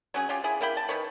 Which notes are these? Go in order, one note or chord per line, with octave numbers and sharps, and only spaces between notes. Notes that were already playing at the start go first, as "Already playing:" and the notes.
F#3 C#4 G#4
C#4 F4 G4
E4 G#4
A#3 E4 G5 B5
A5
D#3 B4 C#5